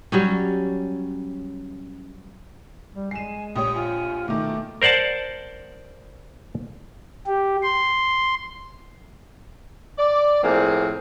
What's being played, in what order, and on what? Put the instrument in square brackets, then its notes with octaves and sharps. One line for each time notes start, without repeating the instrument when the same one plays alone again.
[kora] F#3 G3 C#4
[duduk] G3
[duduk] G#3 [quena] G#5 [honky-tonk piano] C7 E7
[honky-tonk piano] A#1 G4 C#5 [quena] D#6
[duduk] F4 [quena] G#5
[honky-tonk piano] B2 D#3 [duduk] A3 [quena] D6
[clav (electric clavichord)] A#4 C5 D5 F#5 A5
[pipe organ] G4
C6
[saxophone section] D5
A2 F3 A#3 C4 G#4